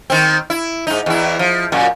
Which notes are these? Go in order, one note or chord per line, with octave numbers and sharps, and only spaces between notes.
D#3 C4
E4
G#2 D#4
E2 E4
F3
F#2 A#2